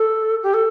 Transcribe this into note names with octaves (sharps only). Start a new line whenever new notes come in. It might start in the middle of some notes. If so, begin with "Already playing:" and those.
Already playing: A4
G4
A4